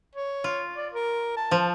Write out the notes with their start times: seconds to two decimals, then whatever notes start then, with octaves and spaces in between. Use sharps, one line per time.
0.15 C#5
0.44 F4
0.76 D5
0.94 A#4
1.37 A5
1.51 F3